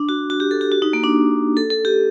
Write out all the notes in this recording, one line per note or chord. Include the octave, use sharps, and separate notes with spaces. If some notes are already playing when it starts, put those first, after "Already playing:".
Already playing: D4
F#4
F#4
G4
A4
G4
F#4
D#4
A#3
D4
A4
A4
G4